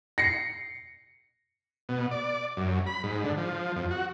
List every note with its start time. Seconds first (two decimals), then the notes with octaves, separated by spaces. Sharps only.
0.18 A#6 C7 C#7
1.89 B2
2.11 D5
2.57 F#2
2.87 B5
3.03 G#2
3.24 D3
3.38 F3
3.76 F2
3.90 F#4